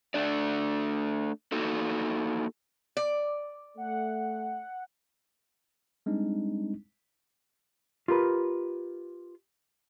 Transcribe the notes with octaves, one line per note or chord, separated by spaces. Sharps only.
A3 D4 D5
A#3 D#4 F#4 A4
D5
A3 F#5
G3 G#3 C4 D4 D#4
F4 G4 A#4 B4